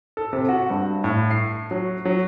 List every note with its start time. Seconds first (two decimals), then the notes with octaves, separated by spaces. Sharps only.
0.17 A4
0.33 C3
0.49 F#4
0.70 G2
1.04 A2
1.31 C7
1.71 F#3
2.05 F#3